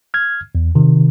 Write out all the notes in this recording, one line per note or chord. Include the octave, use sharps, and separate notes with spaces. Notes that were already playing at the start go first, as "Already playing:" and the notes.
F6 G#6
E2
C3 D#3